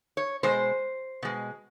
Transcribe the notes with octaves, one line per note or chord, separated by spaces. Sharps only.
C#5
B2 G#3 C5
B2 G#3